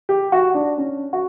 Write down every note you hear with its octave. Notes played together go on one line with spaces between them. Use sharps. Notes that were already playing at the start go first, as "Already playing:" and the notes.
G4
F#4
D4
C#4
F#4